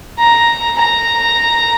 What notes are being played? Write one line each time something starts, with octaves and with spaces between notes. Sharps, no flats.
A#5
A#5